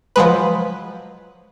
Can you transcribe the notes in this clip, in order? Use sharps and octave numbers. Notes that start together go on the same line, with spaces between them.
F3 F#3 G#3 B4